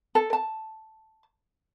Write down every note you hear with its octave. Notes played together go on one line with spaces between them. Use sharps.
A4
A5